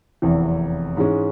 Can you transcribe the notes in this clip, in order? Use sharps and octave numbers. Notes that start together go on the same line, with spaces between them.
F1 E2 C3 E3
G#2 E3 G#3 C#4